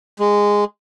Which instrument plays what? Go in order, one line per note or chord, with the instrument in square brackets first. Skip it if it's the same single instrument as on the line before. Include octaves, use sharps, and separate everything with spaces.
[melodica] G#3